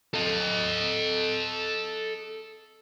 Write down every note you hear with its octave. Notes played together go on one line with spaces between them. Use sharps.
A4 D#5